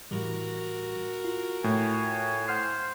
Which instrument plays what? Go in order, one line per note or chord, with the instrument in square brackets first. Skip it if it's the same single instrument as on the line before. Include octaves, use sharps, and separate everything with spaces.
[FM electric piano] A2 E3 G3 [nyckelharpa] F#4 A#4
[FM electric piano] F4
[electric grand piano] A2 [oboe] G#5
[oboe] C5 [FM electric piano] F#5 F6 C7